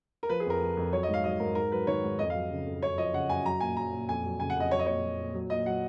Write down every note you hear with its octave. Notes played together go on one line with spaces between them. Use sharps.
A#4
F3 B4
G#4
F2 A#4
F3
F2
F#3 C#5
D#5
G#2
F5
F#3 D#5
G#2 A#4
G#2 A#4
F#3 B4
D#3 C#5
G#2
F2 D#5
F5
F#3
C#3
F2
F#2 C#5
F3 D#5
C#3 F#5
F#2 G#5
F#3 A#5
A#2 G#5
F#3 A#5
A#2
F2 G#5
F#3
C#3 G#5
F#5
F2 D#5
F#3 C#5
D#5
A#2 C#5
F#3
A#2
F#3
A#2 D#5
F#3 F#5